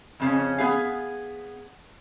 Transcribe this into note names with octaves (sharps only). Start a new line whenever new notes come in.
F2 C#3 C#4
B3 G#4 F5